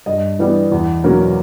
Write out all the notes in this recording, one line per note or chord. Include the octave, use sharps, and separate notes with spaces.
G2 D#5
E3 G3 B3
E2
B2 F#3 A#3 C#4